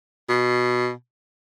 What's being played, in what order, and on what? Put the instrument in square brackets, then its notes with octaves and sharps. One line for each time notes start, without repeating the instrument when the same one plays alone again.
[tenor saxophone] B2